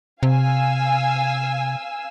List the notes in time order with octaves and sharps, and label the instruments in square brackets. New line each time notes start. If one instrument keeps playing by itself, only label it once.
[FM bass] C3 [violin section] F5 G#5 E6